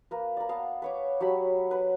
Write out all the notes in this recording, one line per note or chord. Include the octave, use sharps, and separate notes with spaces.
A#3 A#4 B4
A#4 D5
B3 F5 A5
B4 C#5 D6
F#3 G4 A5 B5
B4 F#5